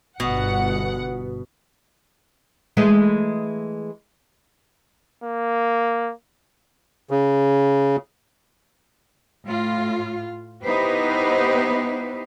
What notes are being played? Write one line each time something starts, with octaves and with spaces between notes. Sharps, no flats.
G1 B2 F#5
E3 G#3 A3
A#3
C#3
A2 F4
B3 D#4 E4 G4 B4 C5